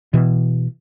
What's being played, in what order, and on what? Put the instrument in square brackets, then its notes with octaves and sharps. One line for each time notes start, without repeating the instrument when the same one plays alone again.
[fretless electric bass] B2 E3